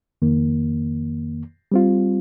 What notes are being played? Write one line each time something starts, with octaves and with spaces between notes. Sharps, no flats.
F2 D#3 A#3
G3 C4 F4